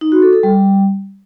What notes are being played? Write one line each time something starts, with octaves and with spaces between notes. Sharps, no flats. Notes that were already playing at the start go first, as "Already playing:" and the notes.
D#4
F#4
A4
A4
G3